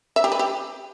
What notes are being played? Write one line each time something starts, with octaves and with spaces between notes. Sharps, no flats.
E5
G4
B4
G4